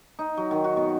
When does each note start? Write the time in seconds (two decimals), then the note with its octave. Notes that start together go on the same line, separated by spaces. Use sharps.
0.19 D#4
0.37 F#3
0.51 D#3
0.64 F#4
0.77 B2